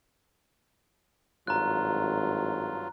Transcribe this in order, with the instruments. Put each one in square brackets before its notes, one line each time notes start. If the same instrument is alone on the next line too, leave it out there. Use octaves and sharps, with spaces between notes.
[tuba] G#1 [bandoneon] G2 F#3 F4 [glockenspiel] A#5 F#6